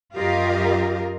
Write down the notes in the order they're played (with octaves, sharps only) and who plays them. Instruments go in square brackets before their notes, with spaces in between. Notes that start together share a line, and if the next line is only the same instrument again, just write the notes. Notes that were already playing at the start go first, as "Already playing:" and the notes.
[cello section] F#2 F4 G4 A#4 D#5 F5